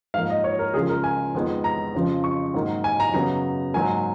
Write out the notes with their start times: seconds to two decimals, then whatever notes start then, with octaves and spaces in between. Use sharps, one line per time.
0.14 G#2 F3 A#3 F5
0.30 D#5
0.44 C#5
0.59 A#4
0.74 C#2 C#3 F3 G#4
0.89 A#4
1.04 G#5
1.35 F2 D#3 G#3 B3
1.64 A#5
1.95 F2 C#3 F3
2.24 C#6
2.54 G#2 D#3 F#3 A#3
2.84 G#5
3.00 A#5
3.13 F#2 C#3 F#3 B3 A#5
3.74 G#2 F#3 A#3 G#5